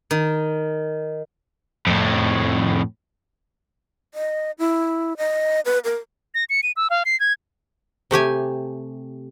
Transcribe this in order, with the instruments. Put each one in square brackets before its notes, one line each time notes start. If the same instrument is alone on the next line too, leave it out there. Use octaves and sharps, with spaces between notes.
[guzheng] D#3
[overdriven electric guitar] F2 A2
[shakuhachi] D#5
E4
D#5
B4
A#4
[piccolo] A#6
C#7
D#7
E6
F5
C7
G#6
[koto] C3 A3 G4 G#5